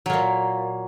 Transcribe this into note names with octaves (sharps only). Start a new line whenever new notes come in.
A#2 F#3 A#3